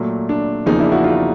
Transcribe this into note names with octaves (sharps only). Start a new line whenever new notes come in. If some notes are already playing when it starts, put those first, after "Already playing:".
Already playing: A#2 F#3 A3
D4
E2 C#3 F3 A#3 D#4
D4 E4
E4 F#4
D#4 F4